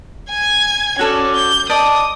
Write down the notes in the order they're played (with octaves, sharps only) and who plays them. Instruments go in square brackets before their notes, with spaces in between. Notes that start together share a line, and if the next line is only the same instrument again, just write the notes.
[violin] G#5 G#6
[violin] C#4 [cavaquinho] F#4 A4 D5
[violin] G6
[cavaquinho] D5 D#5 A5 [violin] D#6